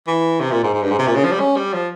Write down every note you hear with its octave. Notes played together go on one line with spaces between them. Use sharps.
E3
C3
A#2
G#2
G#2
G2
G#2
C3
A#2
C#3
F3
G3
C#4
G3
F3